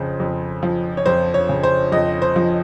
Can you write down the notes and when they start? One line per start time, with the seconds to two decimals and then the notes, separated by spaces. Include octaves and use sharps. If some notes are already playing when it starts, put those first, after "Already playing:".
Already playing: F2 C#3 C5
0.20 F2
0.63 F3
0.97 C#5
1.06 F2 C5
1.34 C#5
1.49 C#3
1.63 C5
1.92 F2 D#5
2.22 C5
2.36 F3